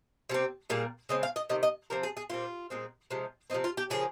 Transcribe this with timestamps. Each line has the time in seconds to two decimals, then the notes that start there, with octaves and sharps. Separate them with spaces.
0.29 C3 G3 C4
0.70 A#2 G3 A#3 G#4
1.09 C#3 G#3 C4 D#5
1.23 F5
1.36 D#5
1.49 C3 D#3 D#5
1.63 D#5
1.90 C3 F3 C4 A#4
2.03 G#4
2.17 G#4
2.30 A#2 G3 C4 F4
2.70 A#2 G#3 C4
3.10 C3 F3 G#3
3.50 C3 F3 C4 D#4
3.64 F4
3.77 G4
3.90 C#3 F3 A#3 G#4